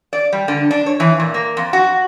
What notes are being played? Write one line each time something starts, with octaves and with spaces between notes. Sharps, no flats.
D5
G3
D3
D4
C#5
E3
A#2
A#3
F2
F#4